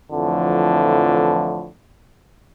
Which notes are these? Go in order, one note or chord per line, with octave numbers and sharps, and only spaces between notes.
F2 A2 D3 E3 F3